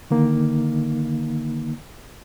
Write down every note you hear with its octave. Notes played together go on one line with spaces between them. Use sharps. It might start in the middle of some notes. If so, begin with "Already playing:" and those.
D3 D#3 A#3 D#4